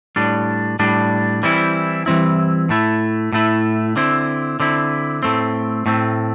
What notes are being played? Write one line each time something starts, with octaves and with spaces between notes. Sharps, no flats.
A2 G3 D4
A2 G3 D4
E3 G3 C4 E4
E3 G3 C4 E4
A2 A3 E4
A2 A3 E4
D3 C4 E4
D3 C4 E4
A2 A3 C4
A2 A3 C4